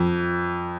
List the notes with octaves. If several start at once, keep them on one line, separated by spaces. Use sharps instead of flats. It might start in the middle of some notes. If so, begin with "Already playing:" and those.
Already playing: F2